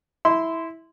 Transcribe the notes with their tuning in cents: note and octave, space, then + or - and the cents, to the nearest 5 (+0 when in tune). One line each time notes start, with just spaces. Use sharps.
E4 -10 C6 -20